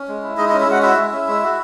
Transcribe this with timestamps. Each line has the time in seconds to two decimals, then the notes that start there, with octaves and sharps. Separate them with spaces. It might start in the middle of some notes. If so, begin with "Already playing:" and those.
Already playing: C#4
0.08 G#3
0.22 E4
0.37 G#3 D#4 D#5
0.49 D#4 D#5
0.52 C#4
0.60 E4 E5
0.67 G#3 F#4 F#5
0.82 E4 F#4 E5
0.97 G#3
1.12 C#4
1.27 G#3
1.42 F#4